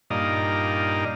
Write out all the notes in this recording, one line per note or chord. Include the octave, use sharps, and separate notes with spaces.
G2 A#2 D#4 D5 D#5 F5